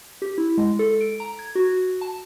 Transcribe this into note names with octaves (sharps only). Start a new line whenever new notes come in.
G4
E4
G#3
A4
D7
A#5
G#6
F#4
A5